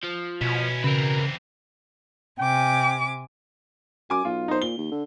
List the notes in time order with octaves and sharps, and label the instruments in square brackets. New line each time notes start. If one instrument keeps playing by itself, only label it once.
[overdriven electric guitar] F3
[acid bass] B2 [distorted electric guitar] C#4 E4
[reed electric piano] C#3 [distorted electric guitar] E3 C4 [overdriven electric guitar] A#4 B4
[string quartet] C3 G#5 D6 [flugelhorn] G5
[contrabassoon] F#2 [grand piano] G#5 D6
[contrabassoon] B1 [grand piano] F4
[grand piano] D#4 C5
[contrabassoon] A#2 [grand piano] G7
[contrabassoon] D#2
D3